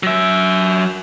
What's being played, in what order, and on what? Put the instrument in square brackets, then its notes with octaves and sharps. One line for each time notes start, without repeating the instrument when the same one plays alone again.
[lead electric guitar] F#3 E5